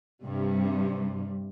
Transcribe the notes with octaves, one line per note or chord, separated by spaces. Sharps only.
G2 C3 G3